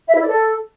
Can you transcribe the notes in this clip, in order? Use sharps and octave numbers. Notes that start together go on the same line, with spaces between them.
E5
E4
D5
A4